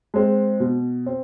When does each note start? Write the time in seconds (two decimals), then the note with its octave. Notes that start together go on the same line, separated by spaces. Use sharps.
0.14 G#3 C4
0.60 B2
1.06 C4